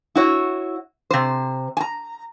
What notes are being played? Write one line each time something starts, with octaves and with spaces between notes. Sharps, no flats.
E4 F#4 C#5
C3 C5
G#5 A#5